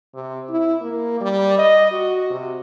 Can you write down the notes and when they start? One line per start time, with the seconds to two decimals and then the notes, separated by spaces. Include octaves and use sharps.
0.14 C3
0.49 E4
0.82 A#3
1.20 G3
1.58 D#5
1.91 F#4
2.30 C3